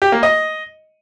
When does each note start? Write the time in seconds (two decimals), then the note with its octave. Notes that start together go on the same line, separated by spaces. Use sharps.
0.02 G4
0.12 A#3
0.23 D#5